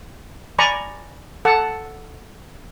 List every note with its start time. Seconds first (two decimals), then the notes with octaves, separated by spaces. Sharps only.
0.59 D5 G#5 A#5 B5 C#6
1.45 A4 F#5 A5